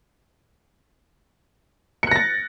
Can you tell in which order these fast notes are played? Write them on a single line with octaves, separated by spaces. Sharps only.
C#7 F#6 A#6 A6